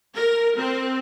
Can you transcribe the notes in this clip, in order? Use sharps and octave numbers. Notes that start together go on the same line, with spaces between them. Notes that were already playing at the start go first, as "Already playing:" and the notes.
A#4
C4